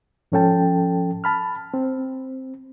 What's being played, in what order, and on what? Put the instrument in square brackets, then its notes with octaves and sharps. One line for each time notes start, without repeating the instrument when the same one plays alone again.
[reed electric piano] G#2 F3 C#4 A4 G5 A5
A5 B5 F6
C4